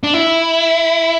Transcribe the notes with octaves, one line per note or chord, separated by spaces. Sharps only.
D4
E4